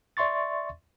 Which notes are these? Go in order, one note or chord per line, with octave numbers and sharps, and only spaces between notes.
D5 E5 C6 C#6 A6